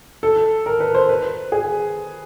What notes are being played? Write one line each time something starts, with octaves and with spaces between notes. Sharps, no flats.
A4
A#4
B4
C5
B4
G#4